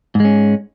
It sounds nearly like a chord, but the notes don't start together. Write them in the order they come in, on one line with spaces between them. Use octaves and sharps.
G#2 G#3 C#4